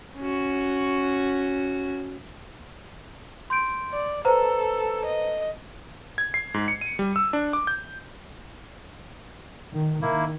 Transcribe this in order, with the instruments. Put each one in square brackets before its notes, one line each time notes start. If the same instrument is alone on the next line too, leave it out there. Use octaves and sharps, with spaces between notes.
[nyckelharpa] C#4 F#4
[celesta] C6 G6 D7
[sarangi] D5
[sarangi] A4 [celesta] B4 C5 A#5
[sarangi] D#5
[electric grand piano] G#6
C7
G#2
C#7
D#7
G3
E6
D4
D6
G6
[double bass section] D#3
[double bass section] D#3 [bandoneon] A#3 E4